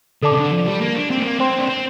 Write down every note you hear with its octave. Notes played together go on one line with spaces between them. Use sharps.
D3 A4 D5 A5 D6
C3
D3
F3
G3
A#3
D4
C4
A3
A#3
C4 C5 G5 C6
D4
C4